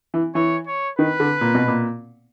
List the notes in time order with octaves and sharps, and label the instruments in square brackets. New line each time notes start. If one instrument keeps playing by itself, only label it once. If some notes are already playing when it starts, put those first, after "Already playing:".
[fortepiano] E3
[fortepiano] E3 [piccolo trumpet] C#5
[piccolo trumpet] C#5
[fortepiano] D#3 [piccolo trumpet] B4
[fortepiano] D3
A#2
B2
A#2